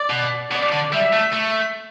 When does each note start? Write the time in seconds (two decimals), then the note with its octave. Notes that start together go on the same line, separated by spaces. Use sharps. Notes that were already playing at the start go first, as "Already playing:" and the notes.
Already playing: D5
0.10 B2
0.51 B2 D5
0.72 D3
0.92 G3 E5
1.13 A3
1.33 A3